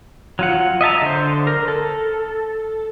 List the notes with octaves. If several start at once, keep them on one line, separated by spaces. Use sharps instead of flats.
F#3 F4 F#5
D#5 E5 A5 A#5
D3 C5
A#4
A4